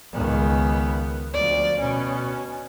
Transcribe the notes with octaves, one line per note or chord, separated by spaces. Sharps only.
C#2 D#3 B3
D2 F3 D5
B2 C#4